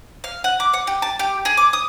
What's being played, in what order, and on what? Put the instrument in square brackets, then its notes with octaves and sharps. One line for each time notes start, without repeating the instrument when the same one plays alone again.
[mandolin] F5
F#5
D6
F#5
G4
A5
G4
G#4
D6
D#6